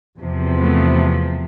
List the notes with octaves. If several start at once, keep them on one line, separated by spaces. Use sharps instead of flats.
E2 C3 F3
A3 B3